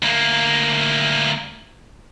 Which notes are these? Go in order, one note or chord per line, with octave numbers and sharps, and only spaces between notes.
D2 A#3